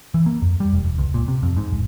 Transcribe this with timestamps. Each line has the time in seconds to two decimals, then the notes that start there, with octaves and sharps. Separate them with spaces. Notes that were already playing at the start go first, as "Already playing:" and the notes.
0.14 E3
0.26 A#3
0.42 F2
0.60 G3
0.73 E1
0.85 E1
0.98 C#2
1.14 A#2
1.28 C3
1.43 F2
1.56 G#2
1.72 D1